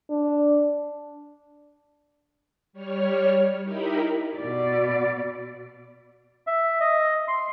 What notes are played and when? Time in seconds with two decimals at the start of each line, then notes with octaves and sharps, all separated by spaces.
0.10 D4
2.73 G3 C#5 F6
3.63 D#4 E4 G4 A#4 B5
4.38 B2 D5
6.47 E5
6.81 D#5
7.28 C6